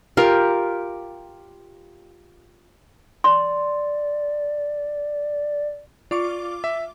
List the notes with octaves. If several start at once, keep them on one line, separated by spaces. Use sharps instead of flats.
F4 G4 A#4
D5 C6
F4 D5 C#6 D6
E5